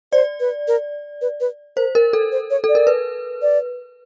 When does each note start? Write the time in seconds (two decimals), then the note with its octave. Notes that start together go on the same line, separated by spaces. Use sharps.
0.12 C5 D5
0.40 B4
0.68 A#4
1.21 B4
1.40 B4
1.77 A#4 C5
1.95 A#4
2.13 A4
2.32 C5
2.50 C#5
2.64 A4
2.69 D5
2.75 A#4
2.87 B4
3.42 D5